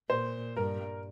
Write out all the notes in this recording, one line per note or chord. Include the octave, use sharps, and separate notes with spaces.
A#2 C5
G2 A#4